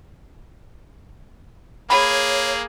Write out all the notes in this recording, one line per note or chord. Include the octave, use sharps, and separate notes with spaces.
A#3 G#4 C#5 B5